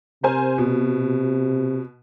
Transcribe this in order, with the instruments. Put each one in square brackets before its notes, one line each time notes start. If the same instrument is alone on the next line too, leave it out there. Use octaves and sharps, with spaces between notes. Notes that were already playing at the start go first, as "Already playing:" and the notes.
[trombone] C3 [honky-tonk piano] A#4 C5 G#5
[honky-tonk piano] B2